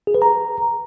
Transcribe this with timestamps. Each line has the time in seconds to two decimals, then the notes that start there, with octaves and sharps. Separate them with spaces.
0.07 G#4
0.15 B4
0.22 A#5